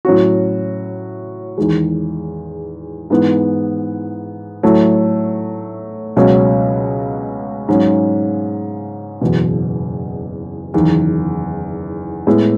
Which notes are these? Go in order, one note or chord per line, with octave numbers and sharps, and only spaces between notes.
A2 F#3 C#4 F#4
E2 D#3 G#3
G#2 E3 B3
A2 F#3 A3 E4 A4
C#2 B2 F#3 C#4
G#2 F#3 C#4
F#1 E2 B2
F#1 E2 D#3
A2 G#3 B3